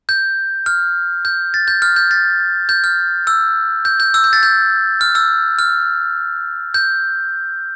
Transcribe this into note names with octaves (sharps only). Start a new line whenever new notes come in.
G6
F6
G6
A6
G6
F6
G6
A6
G6
F6
E6
G6
G6
E6
G6
A6
G6
F6
E6
F6
G6